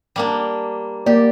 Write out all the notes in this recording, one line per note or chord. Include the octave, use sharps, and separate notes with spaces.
G3 A#3 D4
A#3 G4 D5